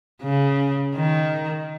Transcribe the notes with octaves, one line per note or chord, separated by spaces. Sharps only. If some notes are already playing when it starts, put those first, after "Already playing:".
C#3
D#3